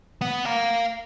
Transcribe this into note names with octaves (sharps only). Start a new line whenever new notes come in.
B3 F#5
F5 A#5